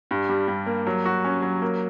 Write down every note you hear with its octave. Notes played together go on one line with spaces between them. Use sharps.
G2
G3
G2
A#3
F#3
F#4
C#4
F#3
A#3